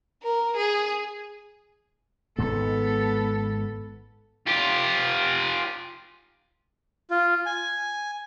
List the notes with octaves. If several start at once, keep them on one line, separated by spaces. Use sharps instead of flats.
A#4
G#4
G#1 G#2 G#3 B3 A4
F4 G4
F4
G#5